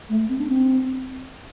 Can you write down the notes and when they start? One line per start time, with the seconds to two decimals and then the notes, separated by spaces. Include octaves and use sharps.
0.09 A3
0.29 C4
0.39 D4
0.48 C4